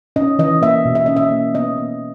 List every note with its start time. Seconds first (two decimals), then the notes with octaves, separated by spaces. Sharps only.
0.16 C#4 D#5
0.39 E3 D#5
0.62 A#3 E5
0.85 B2
0.95 E5
1.06 C#4 D#5
1.17 E5
1.31 A#3
1.54 B3 D#5
1.78 B3